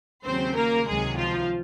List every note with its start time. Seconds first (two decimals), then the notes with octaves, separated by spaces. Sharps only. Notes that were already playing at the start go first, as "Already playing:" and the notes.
0.25 D#2 C#3 F#3 C4 C5
0.56 A#3 A#4
0.87 C#2 C3 D#3 F#3 G#3 G#4
1.18 F3 F4